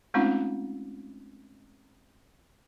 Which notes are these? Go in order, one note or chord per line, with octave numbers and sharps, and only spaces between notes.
G#3 A3 C4 C#4 D#4 F4